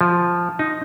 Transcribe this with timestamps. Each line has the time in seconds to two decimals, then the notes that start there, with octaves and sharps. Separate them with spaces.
0.01 F3
0.59 D#4